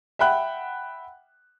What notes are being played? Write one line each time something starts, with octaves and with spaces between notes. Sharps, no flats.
E5 F#5 G5 B5 F#6